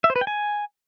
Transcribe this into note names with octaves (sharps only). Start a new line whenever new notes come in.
E5
C5
B4
G5
G#5